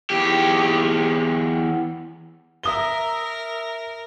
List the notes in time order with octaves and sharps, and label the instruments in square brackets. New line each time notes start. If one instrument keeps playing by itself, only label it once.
[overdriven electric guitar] E2 G4
[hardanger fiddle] A#4 [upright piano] E5 D#6 G7